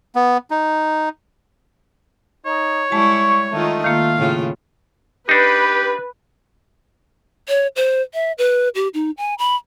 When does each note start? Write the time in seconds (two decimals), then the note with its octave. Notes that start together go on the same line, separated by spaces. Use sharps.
0.16 B3
0.51 D#4
2.46 D#4 C#5
2.92 G3 G#3 E4 A5 C#6
3.52 D#3 A3 D#4 F4
3.84 D#3 A#3 F4 F5
4.18 A2 C#3 F4
5.29 D4 D#4 G4 B4
7.48 C#5
7.76 C5
8.14 E5
8.38 B4
8.75 G4
8.94 D#4
9.17 G#5
9.38 B5